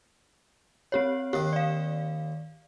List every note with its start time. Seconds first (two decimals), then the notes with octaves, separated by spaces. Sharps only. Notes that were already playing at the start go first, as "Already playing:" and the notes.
0.92 C4 G4 C#5
1.33 D#2 D#3 G4
1.53 D5 F5